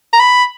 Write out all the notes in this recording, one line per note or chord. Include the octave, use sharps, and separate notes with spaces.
A#5
B5